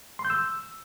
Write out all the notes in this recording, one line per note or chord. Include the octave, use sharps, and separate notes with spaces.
C6
G6
E6